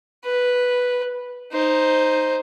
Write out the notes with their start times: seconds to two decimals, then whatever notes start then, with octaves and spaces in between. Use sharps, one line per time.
0.24 B4
1.52 D#4 C5